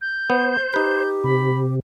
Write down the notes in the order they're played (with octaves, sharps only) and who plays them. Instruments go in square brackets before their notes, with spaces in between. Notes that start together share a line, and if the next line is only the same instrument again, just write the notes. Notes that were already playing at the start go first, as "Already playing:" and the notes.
[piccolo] G6
[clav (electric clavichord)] B3 [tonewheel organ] C5
[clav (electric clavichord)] D#4 B4 [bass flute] G4
[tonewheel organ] C3 [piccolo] B5